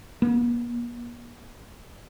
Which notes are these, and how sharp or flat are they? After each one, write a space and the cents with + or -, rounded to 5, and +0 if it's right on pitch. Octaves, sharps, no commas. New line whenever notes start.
A#3 +45